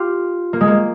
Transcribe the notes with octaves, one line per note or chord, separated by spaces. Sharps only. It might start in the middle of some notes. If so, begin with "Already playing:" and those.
Already playing: F4 G4
A#3
G#3
A#3